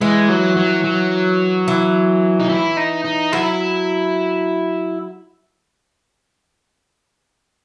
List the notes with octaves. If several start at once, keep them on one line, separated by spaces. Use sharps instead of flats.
E3 G#3
F#3
F#3
F#3
E3
D#4
E4
D#4
D#4
F#3 E4